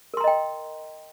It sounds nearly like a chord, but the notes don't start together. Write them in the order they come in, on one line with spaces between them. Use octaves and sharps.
A#4 C6 A#5 D#5 G5